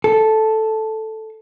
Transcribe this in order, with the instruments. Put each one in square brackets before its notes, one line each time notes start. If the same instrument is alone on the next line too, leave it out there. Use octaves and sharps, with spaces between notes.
[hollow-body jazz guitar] A4